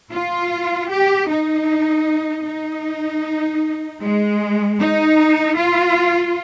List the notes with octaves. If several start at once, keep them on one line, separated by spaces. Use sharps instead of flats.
F4
G4
D#4
D#4
G#3
D#4
F4